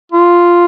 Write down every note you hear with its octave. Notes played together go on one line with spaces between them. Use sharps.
F4